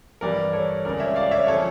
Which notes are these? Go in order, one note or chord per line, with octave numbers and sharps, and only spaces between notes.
G2 E3 G3 A#4 D5
A4 C#5
C#2 C#3 G3 A#4 D5
C#5 E5
D5 F5
C#5 E5
C#3 F3 A4 C#5